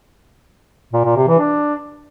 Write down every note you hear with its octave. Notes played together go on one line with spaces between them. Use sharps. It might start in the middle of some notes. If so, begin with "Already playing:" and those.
A#2
A#2
C3
E3
D4